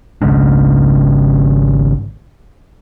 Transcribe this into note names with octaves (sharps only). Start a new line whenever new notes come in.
G#1 C#3 G#3 D4